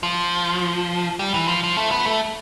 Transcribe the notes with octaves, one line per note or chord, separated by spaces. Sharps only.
F3
G3
E3
F3
F3
A3
B3
A3